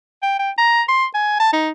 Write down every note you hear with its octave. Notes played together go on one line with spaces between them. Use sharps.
G5
G5
A#5
C6
G#5
A5
D#4